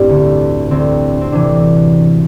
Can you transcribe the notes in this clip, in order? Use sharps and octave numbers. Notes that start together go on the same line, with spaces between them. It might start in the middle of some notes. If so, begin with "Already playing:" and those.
Already playing: A1 G2 G3 C4 D4 E4 G4
D2 D3
D2 D3 C4
C4
D2 C3 E3 D4